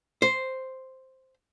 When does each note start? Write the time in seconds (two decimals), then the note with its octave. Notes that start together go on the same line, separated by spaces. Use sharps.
0.22 C5